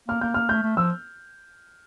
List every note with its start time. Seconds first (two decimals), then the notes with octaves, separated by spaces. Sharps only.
0.08 A#3 F6
0.21 A#3 G6
0.34 A#3 F6
0.49 A3 G6
0.63 A3
0.77 F3 E6